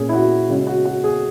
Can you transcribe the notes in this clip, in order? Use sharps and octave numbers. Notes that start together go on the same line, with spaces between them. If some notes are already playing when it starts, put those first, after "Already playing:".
Already playing: A#2 A#3 C#4 G#4
E4
F#4
C#3 G#3 C#4 F#4
F#4
F#4
G#4